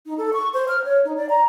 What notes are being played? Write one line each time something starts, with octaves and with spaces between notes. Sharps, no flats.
D#4
A4
C#6
C5
F6
C#5
D#4
D5
A#5